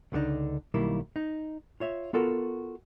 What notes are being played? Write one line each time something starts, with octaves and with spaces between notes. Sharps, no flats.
C#2 D3 A3 D4 D#4
B1 D#3 G3 A#3 E4
D#4
F4 C#5 E5
B3 F4 F#4 A4 A#4